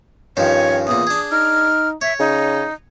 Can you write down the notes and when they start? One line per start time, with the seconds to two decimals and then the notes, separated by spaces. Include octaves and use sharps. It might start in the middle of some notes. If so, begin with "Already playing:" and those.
0.37 G2 D#3 F3 C#4 C#5
0.87 E2 A#2 D#6
1.07 D4 G#4
1.32 D#4 F6
2.01 C#5 E5
2.19 C#3 D#4